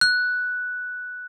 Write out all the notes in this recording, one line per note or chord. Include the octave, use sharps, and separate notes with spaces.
F#6